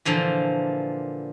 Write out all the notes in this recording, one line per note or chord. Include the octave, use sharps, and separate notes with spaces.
A#2 D3 E3 F3